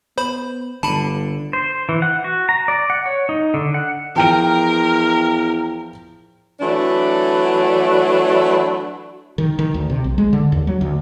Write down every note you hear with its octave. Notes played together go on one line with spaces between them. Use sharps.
B3 C5 B5
G1 D3 A5 B5
C5
E3
F#5
F#4
A#5
D5
F#5
C#5
D#4
D3
F#5
E2 F3 A#4 G5 D7
E3 F#3 A3 D4
D#3
D#3
D2
C3
B1
G#3
D3
D#2
F#3
D2